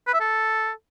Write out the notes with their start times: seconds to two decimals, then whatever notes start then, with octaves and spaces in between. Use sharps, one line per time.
0.07 B4
0.14 E5
0.20 A4